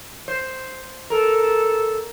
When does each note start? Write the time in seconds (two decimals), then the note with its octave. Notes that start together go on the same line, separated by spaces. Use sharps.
0.28 C5
1.10 A4 A#4